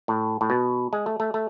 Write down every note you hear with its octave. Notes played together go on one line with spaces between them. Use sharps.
A2
A2
B2
G#3
A3
A3
A3